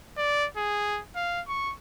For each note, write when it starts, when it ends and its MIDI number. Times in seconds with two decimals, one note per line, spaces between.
0.17 0.47 74
0.57 1.01 68
1.16 1.42 77
1.48 1.74 85